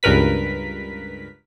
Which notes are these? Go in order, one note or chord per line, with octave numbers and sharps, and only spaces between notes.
C#2 G2 A#4 B4 B6